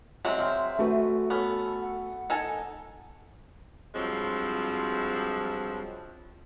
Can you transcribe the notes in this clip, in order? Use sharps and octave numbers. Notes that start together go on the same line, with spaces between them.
F#3 G#3 C4 D#5 E5
G5 F6
A3 F#4 B4
B3 C#4 A4
F#5
D#4 A4 G#5
G2 F3 F#3 G#3 C4